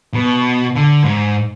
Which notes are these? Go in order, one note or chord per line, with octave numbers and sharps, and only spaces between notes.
B2
D3
G#2